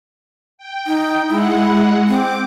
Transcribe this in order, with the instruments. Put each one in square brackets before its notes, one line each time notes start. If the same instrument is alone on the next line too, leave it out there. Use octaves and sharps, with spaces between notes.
[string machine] G5
[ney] D#4
[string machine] G#3 F#5 [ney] E4
[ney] C4 [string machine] D6